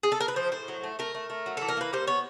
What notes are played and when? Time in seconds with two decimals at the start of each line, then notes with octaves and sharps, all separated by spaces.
0.03 G#4
0.12 A4
0.20 A#4
0.28 B4
0.36 F3 C5
0.52 A2 C5
0.68 F#3
0.84 A3
0.99 A3 A#4
1.14 A3
1.30 A3
1.46 F#3
1.57 E3 A4
1.68 A#4
1.77 A#3 B4
1.93 G3 C5
2.07 B3 C#5